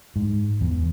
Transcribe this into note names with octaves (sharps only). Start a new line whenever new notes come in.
G#2
E2